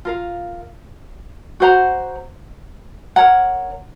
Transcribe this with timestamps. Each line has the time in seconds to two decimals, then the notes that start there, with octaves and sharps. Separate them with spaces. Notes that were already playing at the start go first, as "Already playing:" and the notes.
0.05 F4 A#4 F5
1.60 F#4 C5 F#5 A#5
3.16 A#4 C#5 F#5 A#5